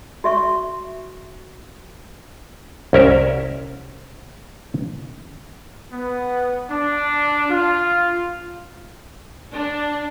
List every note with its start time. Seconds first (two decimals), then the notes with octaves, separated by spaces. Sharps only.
0.24 F#4 E5 C#6
2.93 C2 C#4 A#4 E5
5.93 B3
6.70 D4
7.50 F4
9.54 D4